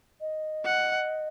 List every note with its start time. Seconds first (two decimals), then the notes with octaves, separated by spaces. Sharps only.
0.21 D#5
0.65 F#5